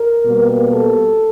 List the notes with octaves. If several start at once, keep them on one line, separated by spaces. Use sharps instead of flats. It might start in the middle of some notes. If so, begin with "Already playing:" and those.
Already playing: A#4
B2 G3 A#3
A4